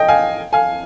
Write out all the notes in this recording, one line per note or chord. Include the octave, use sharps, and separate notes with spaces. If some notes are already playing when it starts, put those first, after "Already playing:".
Already playing: D#5 G5
F5 G#5
F5 G#5